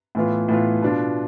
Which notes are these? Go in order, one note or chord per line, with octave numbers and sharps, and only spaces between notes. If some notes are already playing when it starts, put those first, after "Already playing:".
A2 E3 B3 F4
A2 E3 B3 F4
B2 B3 D4 F4